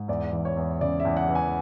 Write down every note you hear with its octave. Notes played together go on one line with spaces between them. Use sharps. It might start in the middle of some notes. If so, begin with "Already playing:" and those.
Already playing: G#2
E2 D5
E3
C#5
E2
C#3 D5
E5
E2
F#5
E3
G#5